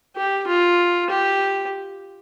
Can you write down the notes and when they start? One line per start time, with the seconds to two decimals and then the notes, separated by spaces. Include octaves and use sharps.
0.17 G4
0.47 F4
1.10 G4